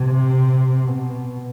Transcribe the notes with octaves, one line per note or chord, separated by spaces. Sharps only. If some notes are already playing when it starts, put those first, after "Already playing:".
Already playing: C3
B2